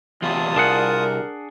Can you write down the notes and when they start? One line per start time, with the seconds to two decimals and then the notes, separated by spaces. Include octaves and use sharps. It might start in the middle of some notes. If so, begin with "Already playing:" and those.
0.22 E2 C3 F4 A5 D#6
0.56 C2 D4 G#4 A#4 F#5